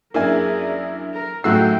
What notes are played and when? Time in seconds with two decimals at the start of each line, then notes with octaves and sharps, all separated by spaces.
0.14 F#2 A#3 D4 E4 G#4 A#4 G#5
1.14 A#4
1.44 F#2 A2 A3 D#4 F#4 G5 E6 C7